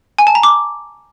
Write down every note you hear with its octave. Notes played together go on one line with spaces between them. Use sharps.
G#5
A5
A#5
D6